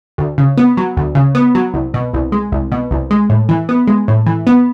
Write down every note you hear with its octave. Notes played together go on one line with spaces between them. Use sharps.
D2
C#3
B3
F#3
D2
C#3
B3
F#3
C2
B2
C2
G#3
C2
B2
C2
G#3
A2
E3
B3
G#3
A2
E3
B3